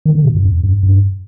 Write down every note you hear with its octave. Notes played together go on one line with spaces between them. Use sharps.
D#3
D3
B2
G2
F2
G2
G2